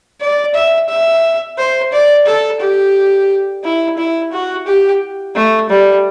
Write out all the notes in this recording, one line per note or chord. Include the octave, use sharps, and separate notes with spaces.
D5
E5
E5
C5
D5
A4
G4
E4
E4
F#4
G4
A3
G3